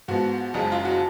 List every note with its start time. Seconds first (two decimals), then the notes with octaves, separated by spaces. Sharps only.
0.08 G#2 F3 B3 F#4
0.54 F#1 F#2 F3 G#3
0.72 F4
0.85 F#4